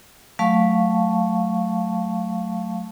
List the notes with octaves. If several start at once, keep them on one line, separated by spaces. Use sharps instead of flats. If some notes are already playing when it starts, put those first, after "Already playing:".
F#3 A3 F5 A5 C#6